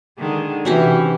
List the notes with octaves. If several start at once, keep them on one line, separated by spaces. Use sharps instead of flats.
D3 D#3 G#3
C3 E3 C#4 F#4 G4